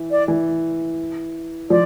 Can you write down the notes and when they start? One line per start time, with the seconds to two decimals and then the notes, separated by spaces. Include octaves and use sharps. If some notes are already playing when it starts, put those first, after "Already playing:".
Already playing: E3
0.11 D5
0.28 E3
1.70 F3 D5